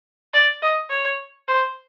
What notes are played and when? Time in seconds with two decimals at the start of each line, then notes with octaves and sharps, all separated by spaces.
0.34 D5
0.62 D#5
0.90 C#5
1.48 C5